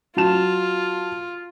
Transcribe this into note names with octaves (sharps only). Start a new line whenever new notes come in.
F#3 F4 A5 E7